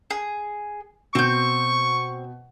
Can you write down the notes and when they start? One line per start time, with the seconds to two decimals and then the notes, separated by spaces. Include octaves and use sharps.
0.10 G#4
1.15 B2 C4 C#6 G6